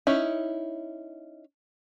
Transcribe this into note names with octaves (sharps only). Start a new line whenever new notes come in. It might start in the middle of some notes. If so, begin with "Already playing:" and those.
C#4 D#4 E4